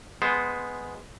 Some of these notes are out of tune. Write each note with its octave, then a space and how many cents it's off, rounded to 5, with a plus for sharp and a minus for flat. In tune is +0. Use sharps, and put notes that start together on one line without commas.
G#3 +0 B3 +0 C5 +0